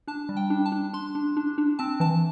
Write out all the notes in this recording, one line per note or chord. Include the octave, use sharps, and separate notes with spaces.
D4 A5
G3
G5
D4
A5
D4
D4 C6
D4
D4
D4
C4 A5
E3 A5